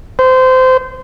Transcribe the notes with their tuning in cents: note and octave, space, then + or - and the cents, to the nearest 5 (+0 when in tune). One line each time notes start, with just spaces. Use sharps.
C5 -25